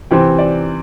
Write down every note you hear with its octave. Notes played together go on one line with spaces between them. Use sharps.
C3 E3 C4 G5
D5